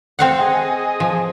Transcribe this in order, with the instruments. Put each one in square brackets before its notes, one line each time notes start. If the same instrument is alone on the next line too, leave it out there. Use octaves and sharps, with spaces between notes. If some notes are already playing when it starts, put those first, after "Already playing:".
[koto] C4 F5 F#5
[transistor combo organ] G#4 D#5
[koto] F3